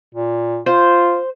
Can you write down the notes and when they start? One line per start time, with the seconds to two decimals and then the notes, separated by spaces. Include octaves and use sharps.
0.15 A#2
0.66 F4 C5